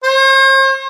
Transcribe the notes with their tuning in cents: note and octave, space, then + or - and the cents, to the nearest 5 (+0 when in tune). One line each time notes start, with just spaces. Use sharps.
C5 +45